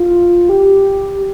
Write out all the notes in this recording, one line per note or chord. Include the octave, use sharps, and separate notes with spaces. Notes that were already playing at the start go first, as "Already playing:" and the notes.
Already playing: F4
G4